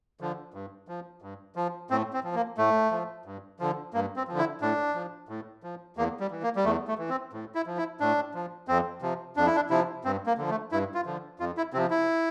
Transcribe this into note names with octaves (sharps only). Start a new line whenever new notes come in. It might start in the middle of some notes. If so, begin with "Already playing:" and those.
D3 F3
G2
F3
G2
F3
A2 C4
C4
F3
A#3
A2 A3
F3
G2
D3 F3
G2 A#3
C4
D3 F3
E4
A2 D4
F3
A2
F3
E2 A#3
G3
E3
A#3
G3
E2 A3
A3
E3
C4
A2
E4
F3
E4
A2 D4
F3
F2 C4
C3 F3
F2 D4
E4
D4
C3 F3 E4
G2 C4
A#3
D3 F3
A3
G2 E4
F4
D3 F3
F2 F4
E4
C3 F3 C4
E4